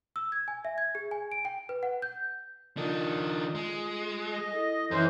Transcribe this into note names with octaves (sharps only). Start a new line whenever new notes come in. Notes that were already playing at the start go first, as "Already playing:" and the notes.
E6
G#6
G#5
E5
G#6
G#4
G#5
D7
G5
B4
F#5
G6
D#3 D4 F4 D#5 D#6
G#3
D#5
E4 A4
F#2 E3 C#4 C5